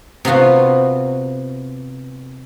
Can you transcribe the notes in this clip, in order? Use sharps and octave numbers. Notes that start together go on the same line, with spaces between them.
C3 B3 F4 F#4